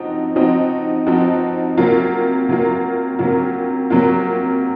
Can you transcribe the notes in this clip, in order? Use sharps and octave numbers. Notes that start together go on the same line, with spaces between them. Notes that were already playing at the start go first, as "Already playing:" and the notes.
Already playing: F3 C4 D#4 F#4
F3 C4 D#4 F#4
F3 C4 D#4 F#4
C3 F#3 A#3 F4
C3 F#3 A#3 F4
C3 F#3 A#3 F4
C3 F#3 A#3 F4